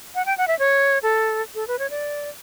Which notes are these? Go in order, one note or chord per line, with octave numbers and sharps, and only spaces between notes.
F#5
G5
F#5
E5
C#5
A4
A4
B4
C#5
D5